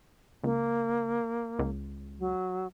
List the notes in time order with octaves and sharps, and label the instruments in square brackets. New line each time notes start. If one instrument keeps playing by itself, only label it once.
[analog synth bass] C#2 [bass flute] A#3
[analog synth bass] C#2
[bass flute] F#3